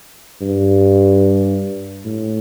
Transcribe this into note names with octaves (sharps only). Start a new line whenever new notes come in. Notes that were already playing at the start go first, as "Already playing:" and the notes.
G2
A2